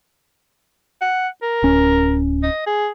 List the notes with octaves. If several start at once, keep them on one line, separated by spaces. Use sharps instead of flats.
F#5
A#4
D1 C#4
D#5
G#4